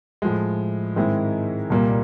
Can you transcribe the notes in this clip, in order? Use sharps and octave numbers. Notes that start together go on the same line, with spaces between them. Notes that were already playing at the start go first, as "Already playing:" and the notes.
A2 F3 G#3
G#2 D#3 G#3 C4 E4
C2 A#2 G3 A#3